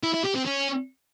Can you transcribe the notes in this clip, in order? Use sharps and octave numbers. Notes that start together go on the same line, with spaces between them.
E4
E4
G4
C4
C#4